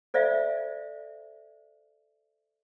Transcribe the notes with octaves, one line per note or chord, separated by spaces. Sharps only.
A4 C5 D5 E5 F5